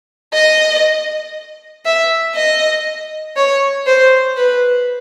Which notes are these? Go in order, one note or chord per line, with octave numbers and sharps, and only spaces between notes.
D#5
E5
D#5
C#5
C5
B4